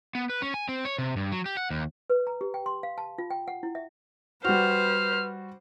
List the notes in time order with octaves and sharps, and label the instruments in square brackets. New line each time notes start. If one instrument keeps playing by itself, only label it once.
[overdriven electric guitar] B3
B4
C#4
G#5
C4
C#5
C3
G2
F#3
G4
F#5
D#2
[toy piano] B4
A#5
G4
G5
C6
F5
A5
F4
G5
F#5
E4
E5
[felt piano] G3 F#4 [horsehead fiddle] B4 [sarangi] C5 [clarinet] F6